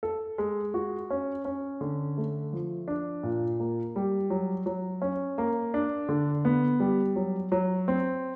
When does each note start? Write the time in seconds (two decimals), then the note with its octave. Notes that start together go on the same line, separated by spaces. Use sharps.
0.03 A4
0.38 G#3
0.74 F#4
1.10 C#4
1.45 C#4
1.81 D3
2.17 A3
2.53 F3
2.88 D4
3.23 A#2
3.60 A#3
3.96 G3
4.30 F#3
4.66 F#3
5.02 C#4
5.38 A#3
5.74 D4
6.09 D3
6.45 B3
6.80 G3
7.16 F#3
7.52 F#3
7.88 C4